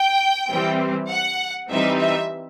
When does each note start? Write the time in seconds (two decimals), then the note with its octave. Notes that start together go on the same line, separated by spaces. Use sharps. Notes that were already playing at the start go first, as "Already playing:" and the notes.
Already playing: G5
0.49 E3 G3 C4
1.10 F#5
1.70 E3 G3 C4 D#4 E5
1.99 E5